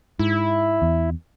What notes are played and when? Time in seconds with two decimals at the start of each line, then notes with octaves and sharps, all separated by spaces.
0.19 G#2 E4
0.82 E2